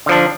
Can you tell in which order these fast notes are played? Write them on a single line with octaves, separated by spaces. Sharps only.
D3 F3 D4